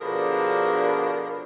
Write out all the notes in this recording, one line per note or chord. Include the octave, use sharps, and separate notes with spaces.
B2 D3 F3 D4 G#4 A#4